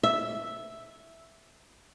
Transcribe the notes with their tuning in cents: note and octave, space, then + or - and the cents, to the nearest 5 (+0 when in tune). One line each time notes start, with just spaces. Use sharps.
E5 +0